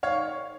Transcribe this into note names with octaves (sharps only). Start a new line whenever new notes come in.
G#2 D#3 C#5 F5